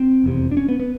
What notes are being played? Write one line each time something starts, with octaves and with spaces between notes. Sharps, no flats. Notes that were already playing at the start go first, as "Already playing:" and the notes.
Already playing: C4
F1 E2 C3
D4
C#4
B3
B3